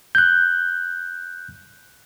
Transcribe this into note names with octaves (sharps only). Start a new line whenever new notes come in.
F#6 G6